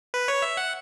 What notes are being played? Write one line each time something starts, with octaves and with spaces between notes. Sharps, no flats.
B4
C#5
E5
F#5